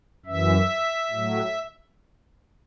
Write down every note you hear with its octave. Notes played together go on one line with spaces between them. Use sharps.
F#2 E3 E5
A2 F#3